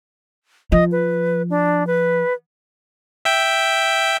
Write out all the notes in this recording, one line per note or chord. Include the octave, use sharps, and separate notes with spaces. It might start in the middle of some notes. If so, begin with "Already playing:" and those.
F3 D#5
B4
D4
B4
E5 G5